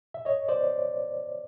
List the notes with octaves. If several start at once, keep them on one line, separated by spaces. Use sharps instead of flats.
E5
C#5 D#5
C5 D5